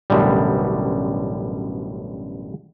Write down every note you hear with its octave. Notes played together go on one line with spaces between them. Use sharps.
A1 F#2 B2 D3 G3